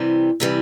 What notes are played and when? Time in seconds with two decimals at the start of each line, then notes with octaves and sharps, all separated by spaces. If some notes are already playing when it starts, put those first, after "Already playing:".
Already playing: C3 E3 G3
0.40 C3 E3 G3